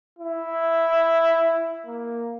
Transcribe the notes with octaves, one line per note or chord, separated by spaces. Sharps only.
E4
A#3